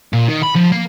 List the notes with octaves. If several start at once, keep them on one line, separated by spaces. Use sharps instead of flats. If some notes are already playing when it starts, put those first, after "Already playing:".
A#2
D#3
B5
F3
A#3